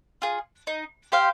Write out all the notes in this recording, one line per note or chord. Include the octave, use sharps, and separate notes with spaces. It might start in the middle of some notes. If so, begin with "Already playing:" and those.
F4 G#4
D#4
G4 C5 F5